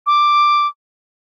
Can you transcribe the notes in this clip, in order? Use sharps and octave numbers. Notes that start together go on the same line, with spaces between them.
D6